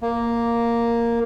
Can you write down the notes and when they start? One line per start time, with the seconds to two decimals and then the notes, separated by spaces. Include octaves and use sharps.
0.02 A#3